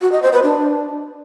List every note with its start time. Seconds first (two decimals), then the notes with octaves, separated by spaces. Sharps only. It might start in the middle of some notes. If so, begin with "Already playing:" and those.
0.02 F#4
0.12 D#5
0.22 C5
0.33 B4
0.43 D4